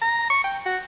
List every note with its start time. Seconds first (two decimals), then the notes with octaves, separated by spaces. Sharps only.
0.02 A#5
0.30 C#6
0.44 G5
0.66 F#4